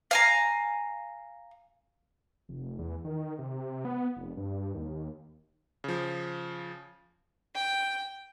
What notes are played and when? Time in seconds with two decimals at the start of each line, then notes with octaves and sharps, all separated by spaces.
0.11 F5 G#5 A#5
2.49 F1
2.79 E2
3.05 D#3
3.39 C3
3.85 B3
4.17 F1
4.37 G2
4.75 D#2
5.84 C#3 F3
7.55 G5